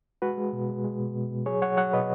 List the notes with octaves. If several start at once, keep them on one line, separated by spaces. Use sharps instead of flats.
G#3 F#4 B4
G#3
B2
G#3
G#3
B2
B2
B2
F#3 G#4 C#5
F#3 C#5 F#5
F#3 C#5 F#5
B2 B4 D#5